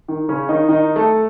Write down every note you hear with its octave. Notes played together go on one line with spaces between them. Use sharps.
D#3
C#3 C#4
D#3 D#4
D#3 D#4
A3 A4